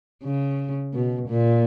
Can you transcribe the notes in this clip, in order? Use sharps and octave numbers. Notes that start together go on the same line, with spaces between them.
C#3
B2
A#2